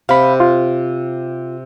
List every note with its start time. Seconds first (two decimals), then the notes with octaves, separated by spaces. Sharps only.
0.09 C3 F5 B5
0.40 F4